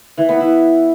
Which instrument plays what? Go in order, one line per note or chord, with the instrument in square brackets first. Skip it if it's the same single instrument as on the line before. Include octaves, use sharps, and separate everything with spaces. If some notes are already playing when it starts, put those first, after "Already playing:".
[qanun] E3
B3
E4